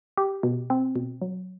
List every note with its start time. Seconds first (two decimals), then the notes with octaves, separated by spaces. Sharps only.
0.17 G4
0.43 B2
0.70 C4
0.96 B2
1.22 F#3